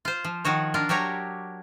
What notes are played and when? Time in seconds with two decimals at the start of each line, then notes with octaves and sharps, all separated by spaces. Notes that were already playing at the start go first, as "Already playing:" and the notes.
0.05 F4 C5
0.24 F3
0.45 D#3 F3 F#4 C#5
0.74 D4 F4 A#4
0.89 F#3 D4 G4 C#5 A#5